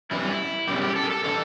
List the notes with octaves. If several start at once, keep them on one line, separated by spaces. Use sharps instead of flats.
F#2 E3 G3 E4
F#2 C#3 G3 G4
G4
A4
G4
A4
C#3 E3 A4